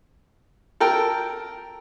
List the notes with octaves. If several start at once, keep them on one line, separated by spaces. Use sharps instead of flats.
A4 A#4 G5